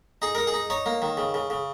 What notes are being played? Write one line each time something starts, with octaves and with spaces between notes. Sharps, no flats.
D#4 G#4
D#4 A#4
G#4
D#4
D#4 C#5
A#3
D#3
C#3
C#3
C#3